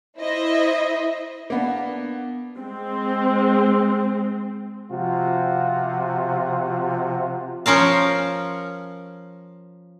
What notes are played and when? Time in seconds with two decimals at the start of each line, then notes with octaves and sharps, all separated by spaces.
0.19 E4 C5 D#5 E5
1.50 A#3 B3 D4
2.58 G#3 C4
4.91 C3 F3 F4 F#4
7.66 F3 C#4 A#4 F5